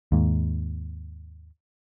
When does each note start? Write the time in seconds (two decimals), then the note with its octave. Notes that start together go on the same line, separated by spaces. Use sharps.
0.12 D#2 G#2